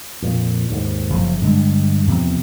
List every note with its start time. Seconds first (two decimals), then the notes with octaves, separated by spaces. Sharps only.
0.22 F2 A#2
0.70 D#2 G#2
1.10 F#1 C#3 F3
1.42 G2 D3 G#3
2.07 E2 C3 F3 B3